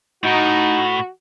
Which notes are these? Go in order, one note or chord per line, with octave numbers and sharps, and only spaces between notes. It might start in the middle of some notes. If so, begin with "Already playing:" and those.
A2 D#4 F#4